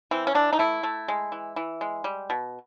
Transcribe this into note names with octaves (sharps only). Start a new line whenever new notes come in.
E3 C4
C#4
E3 D4
D#4
A3 E4
A3
G#3
E3
E3
G#3
G3
B2